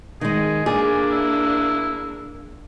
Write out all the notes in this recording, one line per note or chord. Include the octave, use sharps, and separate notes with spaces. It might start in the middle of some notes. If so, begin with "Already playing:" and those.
D#3 G#3 G#4
A#3 D4 G#4 D5
E4